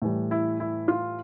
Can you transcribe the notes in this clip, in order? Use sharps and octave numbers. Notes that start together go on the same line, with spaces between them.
A2 E3 G3
E4
E4
F4